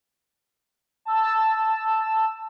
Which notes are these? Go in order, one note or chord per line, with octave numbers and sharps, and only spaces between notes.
A5 E6